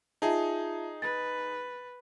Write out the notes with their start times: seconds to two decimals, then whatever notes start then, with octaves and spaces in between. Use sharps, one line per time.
0.22 D#4 F4 G#4 E5 A5
1.02 B4 A6